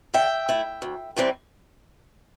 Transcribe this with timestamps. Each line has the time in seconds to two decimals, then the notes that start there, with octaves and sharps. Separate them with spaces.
0.14 D3 E5 G5
0.49 A3 E4
0.82 D2
1.16 C3 E3 G3 C4